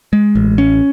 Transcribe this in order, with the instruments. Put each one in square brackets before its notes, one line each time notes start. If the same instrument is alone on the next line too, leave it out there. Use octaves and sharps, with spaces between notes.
[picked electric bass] G#3
A1
C#4